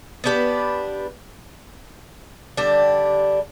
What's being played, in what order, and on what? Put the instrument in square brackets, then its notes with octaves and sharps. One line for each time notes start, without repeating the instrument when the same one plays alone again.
[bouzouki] B3 D4 G4 B4
D3 G3 D4 G4